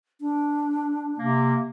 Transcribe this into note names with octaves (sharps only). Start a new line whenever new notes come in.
D4
C3 A#3